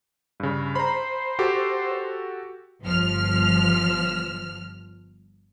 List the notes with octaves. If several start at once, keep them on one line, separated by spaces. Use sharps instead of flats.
G2 C#3
C5 A#5 B5
F#4 G4 A4
G1 F3 F6